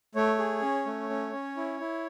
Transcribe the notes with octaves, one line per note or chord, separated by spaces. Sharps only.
A3 C#5
G#4
C#4
A3
C#4
C#4
E4
E4